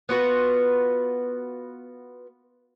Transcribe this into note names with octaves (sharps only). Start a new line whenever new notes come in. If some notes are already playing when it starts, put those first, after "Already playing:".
B3 F4 F#4 B4